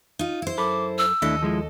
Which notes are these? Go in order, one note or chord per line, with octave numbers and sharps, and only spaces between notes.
D#4 F4
E4 C5
F#2 A4 B5 D6
E6
D#2 A3 D4 E4 A4 D#5
F3 G#3 E4